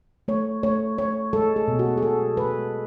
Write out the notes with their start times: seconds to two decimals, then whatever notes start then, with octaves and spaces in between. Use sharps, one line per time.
0.28 A3 C#5
0.63 A3 C#5
0.98 A3 C#5
1.33 G#3 A4
1.56 G#4
1.68 B2
1.79 F#4
1.98 G#4
2.03 G#3 A4
2.37 G#3 B4